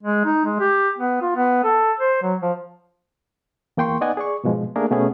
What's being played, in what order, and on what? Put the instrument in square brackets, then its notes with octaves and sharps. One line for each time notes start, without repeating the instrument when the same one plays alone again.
[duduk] G#3
D#4
G#3
G4
B3
F4
B3
A4
C5
F#3
F3
[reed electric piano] E2 A#3 G5 C6 C#6
B3 D#4 D5 D#5 F#5 G#5
G#4 D5 C#6
G#2 B2 F3 G#3
A3 A#3 D4 G#4 A#4
B2 A3 B3 C#4 G#4